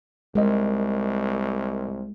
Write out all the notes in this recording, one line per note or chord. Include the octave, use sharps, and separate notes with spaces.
C2 G#3 A#4 D#5